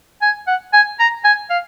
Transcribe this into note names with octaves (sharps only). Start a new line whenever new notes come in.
G#5
F#5
G#5
A#5
G#5
F5